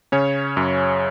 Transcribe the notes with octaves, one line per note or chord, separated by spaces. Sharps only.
C#3 C#4 C#5
F#2